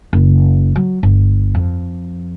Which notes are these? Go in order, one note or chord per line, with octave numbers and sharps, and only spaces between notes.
F#1
F#3
G1
F2